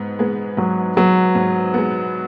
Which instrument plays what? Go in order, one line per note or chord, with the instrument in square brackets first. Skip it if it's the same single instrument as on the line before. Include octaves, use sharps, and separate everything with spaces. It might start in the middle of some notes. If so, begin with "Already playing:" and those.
Already playing: [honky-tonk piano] G#2 B3
G#3 B3
[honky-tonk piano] G#2 [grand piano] F#3
[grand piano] F#3 [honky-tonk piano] G#3 B3
[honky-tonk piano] G#2
G#3 B3